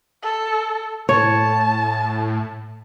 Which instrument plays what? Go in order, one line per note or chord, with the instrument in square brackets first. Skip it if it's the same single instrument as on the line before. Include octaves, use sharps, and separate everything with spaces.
[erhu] A4
[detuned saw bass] A2 [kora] C#5 [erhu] A5